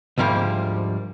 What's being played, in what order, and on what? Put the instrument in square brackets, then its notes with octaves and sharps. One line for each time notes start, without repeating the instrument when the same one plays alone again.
[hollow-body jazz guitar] D2 G#2 F3 G3 A#3